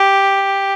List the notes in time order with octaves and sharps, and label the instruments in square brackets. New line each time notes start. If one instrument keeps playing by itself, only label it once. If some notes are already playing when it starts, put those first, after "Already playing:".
Already playing: [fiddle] G4